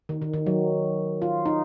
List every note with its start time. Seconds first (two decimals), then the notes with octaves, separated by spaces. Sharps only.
0.09 D#3
0.22 D#3
0.34 D#3
0.46 F#3
1.22 F4
1.46 D#4